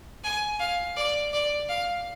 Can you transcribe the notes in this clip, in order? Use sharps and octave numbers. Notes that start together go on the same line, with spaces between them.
G#5
F5
D5
D5
F5